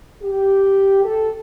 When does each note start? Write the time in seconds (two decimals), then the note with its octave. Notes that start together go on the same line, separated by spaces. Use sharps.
0.22 G4
1.02 A4